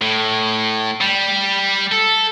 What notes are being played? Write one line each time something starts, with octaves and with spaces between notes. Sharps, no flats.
A2
G3
A4